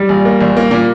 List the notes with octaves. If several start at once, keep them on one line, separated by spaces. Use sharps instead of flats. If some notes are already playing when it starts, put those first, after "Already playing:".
Already playing: G3
A#1
A#3
A#1
A#3
A#2